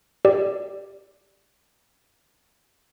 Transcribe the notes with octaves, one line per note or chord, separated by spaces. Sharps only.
G4 D5